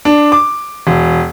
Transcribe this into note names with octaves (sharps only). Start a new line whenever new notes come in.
D4
D6
E1